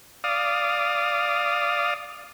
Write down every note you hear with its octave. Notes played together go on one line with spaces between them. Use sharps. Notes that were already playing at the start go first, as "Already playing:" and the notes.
D5 F5 D#6